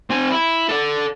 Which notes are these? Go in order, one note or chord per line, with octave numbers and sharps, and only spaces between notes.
C4 G#5
E4
A4 D5